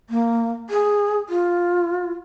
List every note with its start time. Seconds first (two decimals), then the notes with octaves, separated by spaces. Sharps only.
0.10 A#3
0.70 G#4
1.29 F4